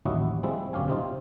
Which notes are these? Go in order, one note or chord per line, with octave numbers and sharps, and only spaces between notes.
A1 D#2 F#3 E4 F#4 D#5
F3 G3 G#3 C4 E4
G1 F#2 C#4 G4 F5 G#5
C3 C4 D#4 F4